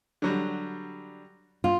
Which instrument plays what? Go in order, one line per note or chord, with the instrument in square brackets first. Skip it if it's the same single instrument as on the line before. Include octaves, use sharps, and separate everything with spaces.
[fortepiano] D3 F#3 G3
[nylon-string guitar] F4